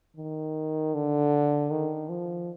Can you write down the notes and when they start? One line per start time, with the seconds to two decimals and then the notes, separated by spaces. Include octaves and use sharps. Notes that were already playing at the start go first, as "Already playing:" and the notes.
0.17 D#3
0.94 D3
1.70 D#3
2.09 F3